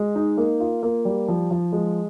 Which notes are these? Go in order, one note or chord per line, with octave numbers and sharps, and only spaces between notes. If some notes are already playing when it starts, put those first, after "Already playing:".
Already playing: G#3
D#4
A#3
F4
A#3
G3
F3
F3
G#3